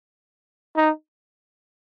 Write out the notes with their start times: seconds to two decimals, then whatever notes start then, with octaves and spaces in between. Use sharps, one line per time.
0.77 D#4